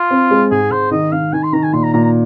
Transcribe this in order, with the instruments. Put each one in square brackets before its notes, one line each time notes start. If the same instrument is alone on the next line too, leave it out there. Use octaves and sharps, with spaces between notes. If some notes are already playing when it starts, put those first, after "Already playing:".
Already playing: [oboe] F4
[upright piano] C4
G#3
[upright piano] G#2 [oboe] G#4
[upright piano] G#2 [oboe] C5
[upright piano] D#3 [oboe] D#5
[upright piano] D#3 [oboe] F5
[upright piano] D#3 [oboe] G#5
[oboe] C6
[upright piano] D#3 [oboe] A#5
[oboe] G#5
[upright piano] A#2 [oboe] C6
[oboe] A#5
[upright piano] A#2 [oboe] A#5
[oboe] A#5